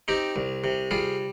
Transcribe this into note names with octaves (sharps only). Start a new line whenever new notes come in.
C4 D#4 G4
C2
C3
G3 F4 G#4